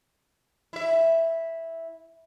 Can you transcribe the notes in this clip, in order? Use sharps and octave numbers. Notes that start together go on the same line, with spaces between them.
E4 E5